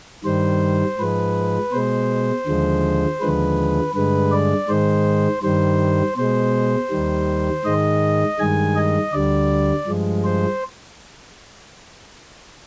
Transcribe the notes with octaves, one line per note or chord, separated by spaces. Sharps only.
G2 D#3 G3 C5
G#2 F3 G#3 B4
B2 G#3 C5
D#2 D3 F3 G#3
D#2 D3 F3 G#3 B4
G2 D3 G#3 B4
D5
G#2 D#3 G#3 C5
G2 D#3 G3 C5
B2 G#3 C5
D#2 D#3 G3
G#2 D#3 G#3 D#5
G2 D#3 G#3 G#5
D#5
D2 D3 G3 D5
G2 F3 G#3
C5